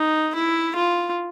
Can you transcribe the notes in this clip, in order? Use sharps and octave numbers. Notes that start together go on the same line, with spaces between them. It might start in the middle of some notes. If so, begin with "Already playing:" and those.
Already playing: D#4
E4
F4